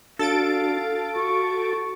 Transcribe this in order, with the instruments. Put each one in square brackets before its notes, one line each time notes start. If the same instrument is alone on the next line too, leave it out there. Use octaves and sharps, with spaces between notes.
[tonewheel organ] D4 F#4 [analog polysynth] A4 A6 D7 [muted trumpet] F5
[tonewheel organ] F#4 [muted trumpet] C#6